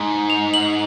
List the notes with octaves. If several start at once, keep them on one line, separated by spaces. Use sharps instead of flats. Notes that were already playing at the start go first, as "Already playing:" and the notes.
Already playing: G#2
F7
F#7